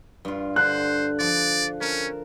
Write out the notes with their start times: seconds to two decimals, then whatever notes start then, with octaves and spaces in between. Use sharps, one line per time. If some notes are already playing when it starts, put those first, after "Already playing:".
0.25 G2 F4
0.56 D3 C5 F#6
1.20 F3 D5
1.81 C#4 A#4 A5